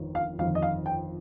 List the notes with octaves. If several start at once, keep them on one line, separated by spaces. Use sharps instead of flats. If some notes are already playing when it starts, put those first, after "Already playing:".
Already playing: G1 F2 D#3
F5
G1 F2 D#3 F5
D#5
F5
G5